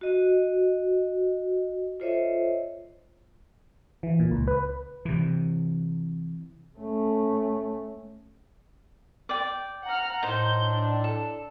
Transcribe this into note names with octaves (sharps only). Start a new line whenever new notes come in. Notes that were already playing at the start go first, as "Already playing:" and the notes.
F#4 D#5
F4 A4 C5 C#5 D#5 E5
E3
A#2
C#2
B4
C3 E3
A3 C#4
D5 G5
F#5 A#5 F6
A2 D#4 C5 G6
D4
A4